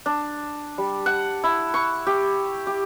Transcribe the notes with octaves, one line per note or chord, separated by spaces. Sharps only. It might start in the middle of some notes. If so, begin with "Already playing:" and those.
D4
G3
F#5
E4
C#6
G4
G4